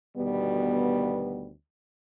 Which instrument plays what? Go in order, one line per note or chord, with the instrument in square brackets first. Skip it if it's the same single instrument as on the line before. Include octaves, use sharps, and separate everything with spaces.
[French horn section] D2 B2 D#3 G3 B3